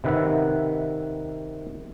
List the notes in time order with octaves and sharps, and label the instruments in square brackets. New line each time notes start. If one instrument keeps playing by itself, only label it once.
[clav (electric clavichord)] C3 D#3 B4 E5 F#5